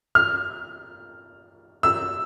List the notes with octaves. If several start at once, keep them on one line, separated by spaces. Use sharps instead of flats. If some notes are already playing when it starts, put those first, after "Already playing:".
F6
E6